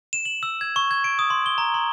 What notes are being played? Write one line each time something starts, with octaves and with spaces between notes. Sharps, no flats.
E7
F#7
E6
G#6
C#6
G#6
D7
D#6
C6
G7
A#5
C6